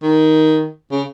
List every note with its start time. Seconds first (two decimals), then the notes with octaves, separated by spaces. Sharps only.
0.03 D#3
0.91 C#3